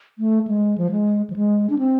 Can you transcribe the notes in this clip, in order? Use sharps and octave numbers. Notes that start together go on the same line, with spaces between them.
A3
G#3
F3
G#3
F3
G#3
D4
C4